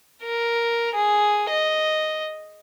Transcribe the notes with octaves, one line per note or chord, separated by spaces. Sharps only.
A#4
G#4
D#5